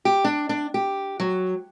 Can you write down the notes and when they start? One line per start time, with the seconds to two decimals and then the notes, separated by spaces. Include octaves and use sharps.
0.05 G4
0.24 D4
0.49 D4
0.74 G4
1.20 F#3